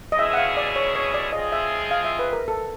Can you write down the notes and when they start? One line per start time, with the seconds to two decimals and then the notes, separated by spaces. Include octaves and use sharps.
0.12 D#5
0.18 B2 G#3 C#4 E4 G#4 E5
0.34 F#5
0.37 F5
0.57 D5
0.76 C#5
0.95 C#5
1.14 D5
1.33 F3 G#3 C4 F4 G#4 D#5
1.52 E5
1.91 F5
2.05 E5
2.19 B4
2.33 A#4
2.48 A4